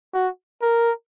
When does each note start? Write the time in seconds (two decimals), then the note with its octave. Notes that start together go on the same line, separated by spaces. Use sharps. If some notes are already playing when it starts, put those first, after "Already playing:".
0.14 F#4
0.62 A#4